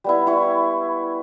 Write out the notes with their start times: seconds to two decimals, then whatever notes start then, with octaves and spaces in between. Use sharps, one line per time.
0.04 G3 B3 E4
0.27 E4 C#6